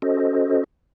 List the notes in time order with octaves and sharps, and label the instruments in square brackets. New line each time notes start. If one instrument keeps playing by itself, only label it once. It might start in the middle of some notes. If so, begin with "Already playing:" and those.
[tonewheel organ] C#4 F#4 A4 C5 D#5